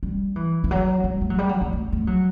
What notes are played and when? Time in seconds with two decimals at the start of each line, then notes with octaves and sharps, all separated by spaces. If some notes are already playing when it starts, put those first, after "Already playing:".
0.03 G3
0.36 E3
0.64 E3
0.71 F#3
1.04 G3
1.21 A3
1.30 F#3
1.38 G3
1.49 F#3
1.61 A3
1.73 A3
1.92 A3
2.07 F#3